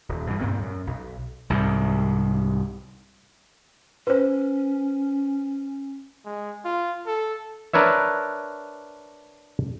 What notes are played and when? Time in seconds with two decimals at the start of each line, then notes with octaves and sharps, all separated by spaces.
0.09 D#1
0.27 G2 B2 E3
0.41 D2 G2 A#2 C4
0.63 F#2
0.87 B1
1.50 C2 G#2 C3
4.07 C#4 B4 C5
6.25 G#3
6.65 F4
7.07 A4
7.73 D4 A#4 B4 C#5 E5